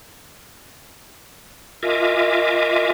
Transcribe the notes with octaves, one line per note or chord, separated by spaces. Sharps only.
F4 A#4 D#5 E5 G#5 D6